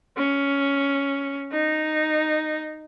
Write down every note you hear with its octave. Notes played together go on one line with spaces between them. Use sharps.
C#4
D#4